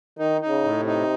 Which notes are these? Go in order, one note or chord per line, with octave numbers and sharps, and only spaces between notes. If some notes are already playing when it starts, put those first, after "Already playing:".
D#3 D#4
D#4
C#3
A2
C3
D#4